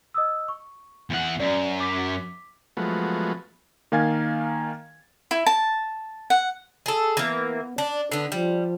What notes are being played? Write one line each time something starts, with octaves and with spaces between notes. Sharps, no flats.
D#5 D#6 E6
C#6
E2 F#5
F#2 D5
D6 B6
F3 F#3 G#3 A3 B3
D#3 A#3 F5 G#5 G#6 A6
E4
A5
F#5
G#4 A4
E3 A#3 B3
D4 D5
D3 B3 D4
F3 G3